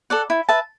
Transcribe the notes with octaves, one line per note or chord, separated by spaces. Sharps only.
A4 D5 F#5
E4
B4 E5 A5